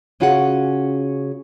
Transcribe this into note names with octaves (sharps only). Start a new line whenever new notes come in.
C#3 C#4 F4 F#4 G#4 F#5